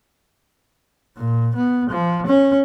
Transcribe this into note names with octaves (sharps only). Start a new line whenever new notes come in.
A#2
B3
F3
C#4